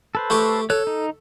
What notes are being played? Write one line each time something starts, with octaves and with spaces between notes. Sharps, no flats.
A4 B4 C5
A3 G4 C#6
A4 C#5 F#6
D#4